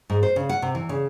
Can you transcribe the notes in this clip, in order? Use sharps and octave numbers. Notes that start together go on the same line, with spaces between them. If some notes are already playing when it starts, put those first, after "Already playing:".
G#2
C5
C#3
F#5
C3
E3
C#3